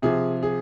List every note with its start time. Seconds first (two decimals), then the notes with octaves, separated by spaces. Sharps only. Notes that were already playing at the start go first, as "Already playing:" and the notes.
0.02 C3 F3 G#4
0.43 G#4